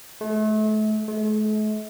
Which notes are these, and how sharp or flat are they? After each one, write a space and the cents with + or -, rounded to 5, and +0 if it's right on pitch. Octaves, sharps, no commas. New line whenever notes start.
A3 -35
A3 -45